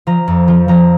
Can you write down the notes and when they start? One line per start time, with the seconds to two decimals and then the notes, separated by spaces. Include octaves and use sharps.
0.07 F3 A#5
0.28 F2
0.48 F3
0.68 F3 A#5